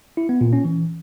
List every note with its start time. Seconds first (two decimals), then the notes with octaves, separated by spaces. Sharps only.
0.17 E4
0.29 B3
0.41 A#2
0.53 C#4
0.65 E3